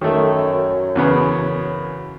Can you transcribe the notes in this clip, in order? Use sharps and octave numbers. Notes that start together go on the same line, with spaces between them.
F#2 D#3 A3
E2 C#3 B3